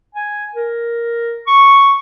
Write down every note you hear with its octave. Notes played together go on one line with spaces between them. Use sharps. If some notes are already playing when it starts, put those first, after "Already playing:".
G#5
A#4
C#6